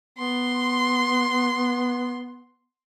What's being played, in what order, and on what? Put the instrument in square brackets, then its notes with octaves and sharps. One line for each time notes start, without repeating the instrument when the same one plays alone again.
[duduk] B3 [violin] C6